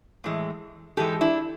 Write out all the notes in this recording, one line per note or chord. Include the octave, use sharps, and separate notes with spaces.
A2 E3 G#3
G#2 E3 G#3 G4 A4
D4 E4